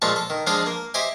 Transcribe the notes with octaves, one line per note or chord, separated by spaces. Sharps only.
A#2 F3 G#3 F4 A5 C#6
A4
D#3
F3 G#3 D4 F4 G#4 D#5
A#3
G4 C5 D#5 E5 G5 G#5